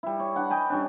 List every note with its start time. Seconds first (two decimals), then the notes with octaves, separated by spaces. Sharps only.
0.03 G3 E4
0.20 C#5
0.36 D4 F#5
0.50 D#5 G5 G#5 B5
0.70 G3 C#4 D4